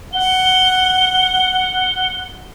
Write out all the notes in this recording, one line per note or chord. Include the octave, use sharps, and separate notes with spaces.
F#5 G7